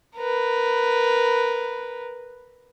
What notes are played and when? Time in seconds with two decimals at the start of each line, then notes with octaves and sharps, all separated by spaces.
0.18 A#4 B4